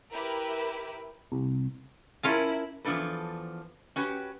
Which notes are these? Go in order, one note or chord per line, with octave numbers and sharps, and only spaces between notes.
E4 G4 A#4 B4
C2
C#4 E4 F4 A#4 A5
E2 F3 G3 D4 A4 B4
C#4 F#4 G4 B4